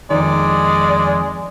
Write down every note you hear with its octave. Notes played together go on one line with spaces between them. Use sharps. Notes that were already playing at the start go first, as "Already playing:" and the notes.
F2 D#3 G#3 D5